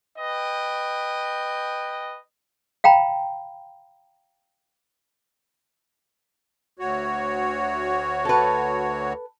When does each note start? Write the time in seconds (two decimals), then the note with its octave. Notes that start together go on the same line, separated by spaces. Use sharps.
0.18 B4 D#5 G5
2.84 F5 G5 A#5 B5
6.79 D2 F#4 C#5
8.25 A4 B4